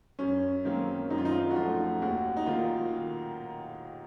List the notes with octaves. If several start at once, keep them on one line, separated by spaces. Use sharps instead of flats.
F#2 C#4
D#3 F#3 A#3 C4
F#2 D#4
F4
D#4
F4
D#4
F#4
F3 A3 F4
D#2 F#4
D#4
D#3 A#3 F4